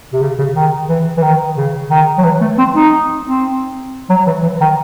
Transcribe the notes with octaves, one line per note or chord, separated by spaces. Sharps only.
C3
C#3
C#3
D#3
E3
E3
D#3
C#3
D#3
F#3
E3
A3
C4
D#4
C4
F#3
E3
E3
D#3